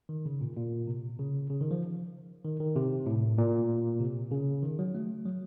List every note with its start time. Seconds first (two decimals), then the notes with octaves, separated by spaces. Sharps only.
0.09 D#3
0.26 C#3
0.41 A#2
0.57 A#2
0.87 C3
1.19 C#3
1.50 C#3
1.61 D#3
1.71 F3
2.45 D#3
2.60 D#3
2.76 C3
3.06 A2
3.38 A#2
4.00 C3
4.31 C#3
4.63 D#3
4.79 F#3
4.95 A3
5.25 F#3